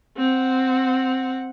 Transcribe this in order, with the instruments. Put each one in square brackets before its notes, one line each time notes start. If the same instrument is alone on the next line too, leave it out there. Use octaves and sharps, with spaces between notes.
[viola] C4 F#5